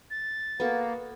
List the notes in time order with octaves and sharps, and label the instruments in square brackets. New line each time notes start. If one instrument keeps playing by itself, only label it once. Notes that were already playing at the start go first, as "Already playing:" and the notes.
[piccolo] A6
[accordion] A#3 [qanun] B3 F#4 [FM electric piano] A4 B4